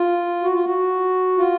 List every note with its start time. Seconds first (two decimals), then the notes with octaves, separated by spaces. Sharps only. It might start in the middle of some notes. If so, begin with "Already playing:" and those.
Already playing: F4
0.43 F#4
0.54 F4
0.64 F#4
1.38 F4